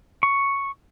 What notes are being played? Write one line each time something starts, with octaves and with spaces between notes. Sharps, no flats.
C#6